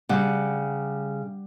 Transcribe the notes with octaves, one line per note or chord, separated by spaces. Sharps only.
C#3 G3 F#5